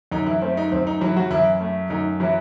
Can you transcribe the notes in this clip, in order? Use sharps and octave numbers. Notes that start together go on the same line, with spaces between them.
F#2 D#4
E3 E4
A3 C4
D#4
F#2 C4
D#4
E3 F#3 E4
F#3 F#4
F#2 E3 E4
A3
F#2 D#4
E3 F#3 E4